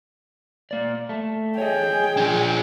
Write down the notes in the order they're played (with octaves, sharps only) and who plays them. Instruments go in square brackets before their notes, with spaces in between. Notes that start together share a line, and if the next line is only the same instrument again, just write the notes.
[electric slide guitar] A#3 D5
A3
[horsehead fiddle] G#4 G5 [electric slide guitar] C#5 D#5
[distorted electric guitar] F3 D4